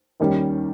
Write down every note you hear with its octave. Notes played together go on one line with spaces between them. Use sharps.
D#2 D#3 G3 C#4